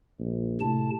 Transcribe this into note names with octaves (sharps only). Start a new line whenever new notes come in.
A#1
A2 C3 A5